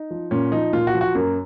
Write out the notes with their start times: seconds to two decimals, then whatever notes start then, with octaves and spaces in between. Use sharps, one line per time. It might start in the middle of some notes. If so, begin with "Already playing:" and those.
Already playing: D#4
0.11 F3
0.31 A#2 C#4
0.52 F3 D#4
0.73 A#2 F4
0.87 F#4
0.94 F3
1.01 F#4
1.15 F#2 A#3